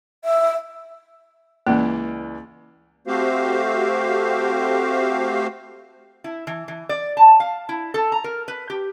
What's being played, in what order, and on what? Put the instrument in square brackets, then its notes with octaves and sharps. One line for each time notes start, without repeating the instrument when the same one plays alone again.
[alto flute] E5
[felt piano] C#2 E3 D5 [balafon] A#3
[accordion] A3 C4 F#4 G4 C5 F5
[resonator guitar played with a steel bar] E4
E3
E3
D5
A5
F5
E4
A4
A#5
A#4
B4
G4